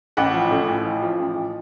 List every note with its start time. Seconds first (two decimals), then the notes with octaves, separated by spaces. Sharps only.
0.17 A1 F#5
0.34 F3
0.50 A2
0.68 A1
0.85 F3
1.02 F3
1.19 A1
1.35 A1